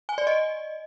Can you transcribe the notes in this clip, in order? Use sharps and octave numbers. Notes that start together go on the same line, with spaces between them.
G#5
D5
D#5